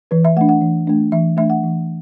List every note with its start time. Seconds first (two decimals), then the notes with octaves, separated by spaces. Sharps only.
0.11 E3 B4
0.25 E5
0.37 A3 F#5
0.41 D4
0.49 F#5
0.61 E3
0.87 A3 D4
1.12 E3 E5
1.37 A3 D4 E5
1.50 F#5
1.63 E3